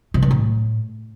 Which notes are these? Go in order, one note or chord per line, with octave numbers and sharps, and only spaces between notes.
C3
G2
A2